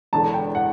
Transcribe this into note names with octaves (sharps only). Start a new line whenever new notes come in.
E1 E2 D3 A5
G5
F#5